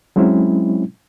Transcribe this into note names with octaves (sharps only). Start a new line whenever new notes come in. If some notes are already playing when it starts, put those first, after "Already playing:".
F#3 G#3 C4 C#4 E4